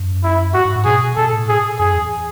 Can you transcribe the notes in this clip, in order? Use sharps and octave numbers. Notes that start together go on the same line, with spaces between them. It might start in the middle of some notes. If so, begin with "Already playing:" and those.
Already playing: F#2
E4
G#2 F#4
G#2
G#2
B2 G#4
B2 A4
A2
G#4
F#2 G#4
E2